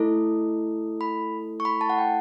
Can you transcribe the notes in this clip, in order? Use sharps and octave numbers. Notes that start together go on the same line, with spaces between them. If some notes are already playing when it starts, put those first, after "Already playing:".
Already playing: A3 E4 A4
B5
C#6
B5
A5
F#5
G5